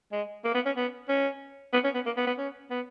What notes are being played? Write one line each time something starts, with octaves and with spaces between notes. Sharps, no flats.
G#3
A#3
B3
C#4
B3
C#4
B3
C#4
B3
A#3
B3
B3
C#4
B3